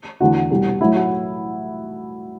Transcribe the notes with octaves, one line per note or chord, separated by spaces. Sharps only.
E2 D3 A3 F#4
C2 B2 G3
A2 F#3 A3 E4
F#4